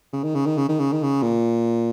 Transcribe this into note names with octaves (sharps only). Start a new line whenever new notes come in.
C#3
D#3
C#3
D#3
C#3
D#3
C#3
D#3
C#3
A#2